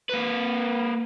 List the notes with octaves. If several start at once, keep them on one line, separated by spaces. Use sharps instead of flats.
A#3 B4